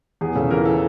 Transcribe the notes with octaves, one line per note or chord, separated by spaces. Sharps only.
E2 G#4
C#3 A4
E3 A#4
A4